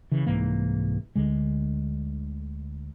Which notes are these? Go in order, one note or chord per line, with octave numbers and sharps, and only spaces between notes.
C#3 E3
C2 G#2 E3 A#3
D2 D3 G#3